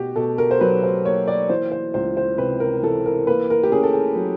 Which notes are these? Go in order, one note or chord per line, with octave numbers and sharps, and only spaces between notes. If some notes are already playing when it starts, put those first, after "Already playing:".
Already playing: B2 F#4 G4
B2 A4
A#4
C5
F#3 B4
C5
A#3 C#5
D5
E3 C5
C5
C#2 C5
C5
C3 B4
A#4
E3 A4
A#4
A#3 B4
A#4
G4
C#4 G#4
A4
G#4
F#3